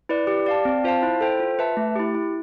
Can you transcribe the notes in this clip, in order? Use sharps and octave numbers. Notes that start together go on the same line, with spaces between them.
E4 B4 D5
G4
D5 F5 A5
C4
F4 C5 F5 A5
E4
A4 C5 G5
F4
B4 E5 A5
A3
E4 G4
E4